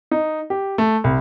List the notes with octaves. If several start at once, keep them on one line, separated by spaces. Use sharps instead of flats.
D#4
G4
A3
C2